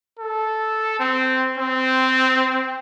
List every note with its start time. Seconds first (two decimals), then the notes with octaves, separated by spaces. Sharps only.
0.19 A4
1.00 C4
1.58 C4